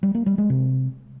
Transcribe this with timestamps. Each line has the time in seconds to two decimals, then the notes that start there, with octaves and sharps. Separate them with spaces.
0.03 G3
0.15 A#3
0.26 G3
0.38 G#3
0.50 C3